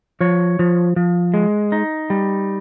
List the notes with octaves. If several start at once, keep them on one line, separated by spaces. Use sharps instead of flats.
F3 C#5
F3
F3
G#3
D#4
G3